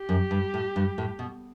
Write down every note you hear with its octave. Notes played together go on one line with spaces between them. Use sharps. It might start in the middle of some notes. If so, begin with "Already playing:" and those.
Already playing: G4
F#2
G2
A2
G2
A2
B2